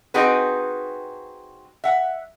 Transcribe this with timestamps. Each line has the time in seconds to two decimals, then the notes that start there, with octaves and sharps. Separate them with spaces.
0.14 C4 D#4 F#4 G#4 B4
1.84 E5 F#5